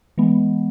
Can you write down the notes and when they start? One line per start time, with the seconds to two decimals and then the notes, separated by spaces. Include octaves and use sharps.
0.18 E3 G#3 B3